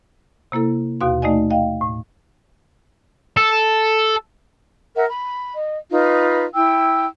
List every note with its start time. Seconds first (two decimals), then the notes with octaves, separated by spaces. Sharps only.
0.52 C3 A#3 E4 A4
1.01 D#2 B2 F#4 F5 C6
1.22 A3 D#4 D5 D#5 G#5
1.50 D#5 F5 G5
1.81 A2
3.37 A4
4.95 A#4 E5 F#5
5.09 B5
5.54 D#5
5.90 D#4 F4 B4 F5
6.55 E4 G5 E6